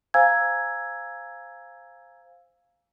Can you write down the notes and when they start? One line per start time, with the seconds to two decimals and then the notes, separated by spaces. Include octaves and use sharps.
0.14 C5 F5 G#5 A#5 E6 G#6